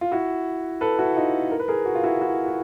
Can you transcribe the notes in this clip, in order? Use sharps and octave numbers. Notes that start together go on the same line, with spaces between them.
F4
E4 F#4
A4 B4
E4 F#4
D#4 F4
A#4
B4
G#4 A#4
F#4
F4
E4 F#4
E4 F#4
F#4